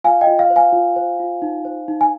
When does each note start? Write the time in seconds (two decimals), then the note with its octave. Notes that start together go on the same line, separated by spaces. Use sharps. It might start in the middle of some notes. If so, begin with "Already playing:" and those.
0.04 F4 F5 G#5
0.21 D#5 G5
0.27 F4
0.39 F5
0.50 C5
0.56 F5 G#5
0.73 F4
0.96 C5
1.20 F4
1.42 D#4
1.65 C5
1.88 D#4
2.01 G#5